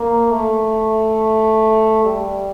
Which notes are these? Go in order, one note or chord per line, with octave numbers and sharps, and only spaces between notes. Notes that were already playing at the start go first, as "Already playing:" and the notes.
Already playing: A#3
A3
G3